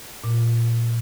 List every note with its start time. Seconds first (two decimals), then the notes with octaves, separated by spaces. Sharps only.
0.24 A#2